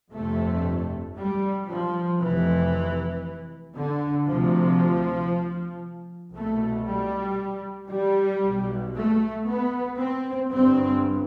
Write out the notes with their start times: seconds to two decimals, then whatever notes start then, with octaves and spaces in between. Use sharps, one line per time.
0.13 G1 F2 C3 A3
1.17 G3
1.69 F3
2.20 F1 F2 C3 E3
3.76 D3
4.28 D2 C3 F3
6.35 C2 B2 A3
6.87 G3
7.91 G3
8.43 B1 B2
8.95 A3
9.47 B3
9.98 C4
10.50 G1 G2 C4